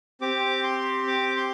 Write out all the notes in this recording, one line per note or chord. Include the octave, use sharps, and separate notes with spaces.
C4 G4 D6
C6
D6
C6